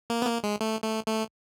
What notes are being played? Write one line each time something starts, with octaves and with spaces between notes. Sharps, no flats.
A#3
B3
A#3
G#3
A3
A3
A3